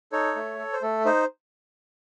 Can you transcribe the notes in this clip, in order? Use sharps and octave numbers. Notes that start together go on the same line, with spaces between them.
D#4 A4 C#5
A3
A4
C5
A3 A4
D#4 C5